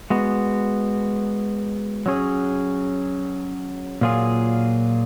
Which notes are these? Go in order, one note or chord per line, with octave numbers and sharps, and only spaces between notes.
G#3 B3 F#4
F#3 C#4 G#4
A#2 F#3 A#3 F4 G#4